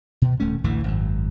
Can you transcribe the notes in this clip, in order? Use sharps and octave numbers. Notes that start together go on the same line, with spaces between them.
B2
D#1 A3 C#4
A1 D2 A2 E3
G#1 F#2